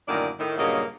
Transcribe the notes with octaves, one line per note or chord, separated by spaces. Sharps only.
F#2 A2 D3 D#3 A#3 D5
A2 D#3
G2 A#2 C#3 F#3 A#3 D#5